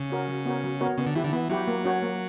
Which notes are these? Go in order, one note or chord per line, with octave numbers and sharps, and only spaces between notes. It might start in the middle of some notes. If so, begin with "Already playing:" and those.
Already playing: C#3
C#4 F#4 A#4 C#5
F#3
B3 F#4 A#4 C#5
F#3
B3 F#4 A#4 C#5
C#3 B3
D3
E3 E4 G4
D3
E3 B3
F#3 E4 G4
A#3
C#4 F#4 C#5
A#3